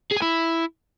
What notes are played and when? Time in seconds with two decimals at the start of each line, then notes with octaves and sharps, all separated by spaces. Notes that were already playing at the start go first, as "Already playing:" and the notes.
0.12 G#4
0.17 G#5
0.22 E4